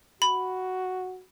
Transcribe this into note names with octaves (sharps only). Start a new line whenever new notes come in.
F#4 B5